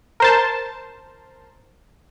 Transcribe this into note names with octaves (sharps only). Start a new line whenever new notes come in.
A#4 C5 A5